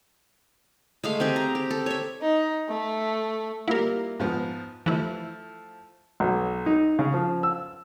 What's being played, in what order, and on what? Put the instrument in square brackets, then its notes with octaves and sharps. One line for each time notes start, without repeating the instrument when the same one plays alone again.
[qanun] G#3 A3 F5
C4 G4 G#4
A#5
G4
A4
C#5 E5
[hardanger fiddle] D#4
A3
[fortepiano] G3 A#3 F4 [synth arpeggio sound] E4 A#4
[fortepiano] G#2 F3 B3
[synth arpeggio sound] E3 E4 [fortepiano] F3 A3
[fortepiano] B1
D#4
C#3
F3
E6